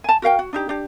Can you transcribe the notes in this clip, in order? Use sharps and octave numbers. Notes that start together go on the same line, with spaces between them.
G#5 A5
F#4 A#4 F5 G5
F#4
D4 D#4 G4
D4 G4